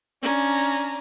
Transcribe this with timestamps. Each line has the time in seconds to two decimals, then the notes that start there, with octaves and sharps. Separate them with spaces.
0.22 C#4 D4 A#5